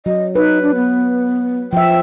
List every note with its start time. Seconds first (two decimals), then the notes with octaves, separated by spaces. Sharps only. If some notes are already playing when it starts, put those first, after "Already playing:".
0.06 F#3 D#5
0.36 D#4 B4
0.62 D4
0.75 B3
1.73 F3 E5 G5